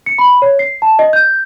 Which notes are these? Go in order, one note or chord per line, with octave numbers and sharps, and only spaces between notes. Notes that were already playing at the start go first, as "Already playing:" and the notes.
C#7
B5
C#5
C7
A5
D#5
G6